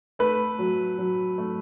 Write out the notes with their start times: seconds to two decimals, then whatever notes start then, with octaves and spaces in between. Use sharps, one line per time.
0.19 A3 B4
0.59 F#3
0.98 F#3
1.38 A3